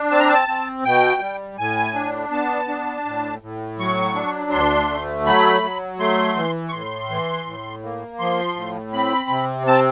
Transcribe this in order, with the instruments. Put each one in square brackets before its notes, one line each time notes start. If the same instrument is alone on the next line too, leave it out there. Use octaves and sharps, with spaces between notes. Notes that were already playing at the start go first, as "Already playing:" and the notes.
Already playing: [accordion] D4
C4 A5
A#5
A5
C4
B2 G5
G3
A2 G#5
D4
B3 A5
D4
A2
A2
F#3 C#6
D4
D2 C6
A3
F#3 B5
F#3
A3 C6
E3
C#6
A2 C6
E3
A2
A#3
F3 C6
A2
C4 B5
C3
C4 A5